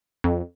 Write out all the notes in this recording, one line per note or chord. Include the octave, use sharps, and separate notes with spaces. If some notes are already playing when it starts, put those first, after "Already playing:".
F2